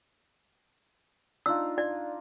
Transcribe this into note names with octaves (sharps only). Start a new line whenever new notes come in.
D4 D#4 F4 E6
D5